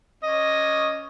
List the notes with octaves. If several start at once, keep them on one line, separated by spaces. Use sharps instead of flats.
C#4 D#5